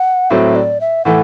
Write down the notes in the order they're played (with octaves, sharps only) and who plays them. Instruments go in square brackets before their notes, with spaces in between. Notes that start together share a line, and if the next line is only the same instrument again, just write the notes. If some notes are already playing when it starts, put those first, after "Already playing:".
Already playing: [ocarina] F#5
[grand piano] A2 F#3 A3 C4 [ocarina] E5
[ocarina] D5
E5
[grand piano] A2 E3 A3 [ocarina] F#5